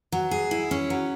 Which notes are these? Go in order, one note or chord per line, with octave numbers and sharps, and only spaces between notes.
F#3
G#4
E4
C#4
F#3